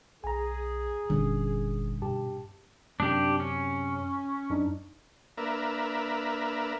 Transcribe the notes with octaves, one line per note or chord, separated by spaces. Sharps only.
B1 G#4 G#5 A#5
F#1 A#2 D3 G3 C#4
G2 B2 G4 A5
F#2 C3 D4 G4
C#4
F#2 D4 D#4
A#3 D4 A#4 B4 E5